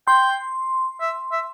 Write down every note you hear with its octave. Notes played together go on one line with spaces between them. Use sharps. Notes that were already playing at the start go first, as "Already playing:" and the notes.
G5 C6
E5
E5